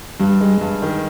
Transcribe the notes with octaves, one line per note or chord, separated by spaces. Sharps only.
G2 G3
G#3
G2
D#3